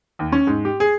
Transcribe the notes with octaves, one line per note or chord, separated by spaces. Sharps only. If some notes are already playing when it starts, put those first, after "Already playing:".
D#2
C#4
G#2
G4
G#4